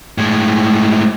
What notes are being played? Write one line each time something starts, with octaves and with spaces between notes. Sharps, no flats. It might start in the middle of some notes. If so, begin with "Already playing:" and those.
A2 G#3